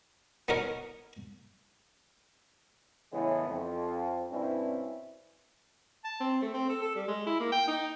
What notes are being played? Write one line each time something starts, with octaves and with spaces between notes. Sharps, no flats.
B3 D#4 A#4 C#5
A2 C#3 E3 G#3 B3 E4
F2
G2 B2 C4 C#4 E4
A5
C4
A3
C4
A4
A4
G3
G#3
E4
A#3
G5
D#4